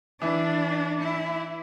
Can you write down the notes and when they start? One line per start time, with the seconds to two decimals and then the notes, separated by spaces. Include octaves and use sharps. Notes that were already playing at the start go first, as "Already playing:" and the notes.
0.22 E3 D4 E4
1.01 E4